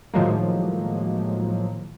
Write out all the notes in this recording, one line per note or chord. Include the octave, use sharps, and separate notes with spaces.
A2 D#3 F3 F#3 G#3 A#3